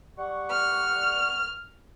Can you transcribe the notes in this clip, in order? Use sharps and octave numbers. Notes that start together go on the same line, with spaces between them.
G3 F#5 C#6
F6